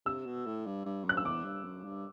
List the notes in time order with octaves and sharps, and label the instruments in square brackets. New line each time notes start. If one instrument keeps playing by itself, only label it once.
[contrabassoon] C3 [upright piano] E6
[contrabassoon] B2
A2
G2
G2
[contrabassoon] F#2 [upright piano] F#6
[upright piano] E6
[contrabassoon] E2 [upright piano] D6
[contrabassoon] G2
F#2
G2